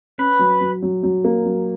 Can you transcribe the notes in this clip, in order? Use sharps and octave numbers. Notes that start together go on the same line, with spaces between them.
C#4 B4
F#3
F#3
F#3
F#3
A#3
F#3